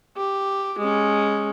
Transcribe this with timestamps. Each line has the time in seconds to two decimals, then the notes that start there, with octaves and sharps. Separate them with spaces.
0.17 G4
0.79 G#3 C#4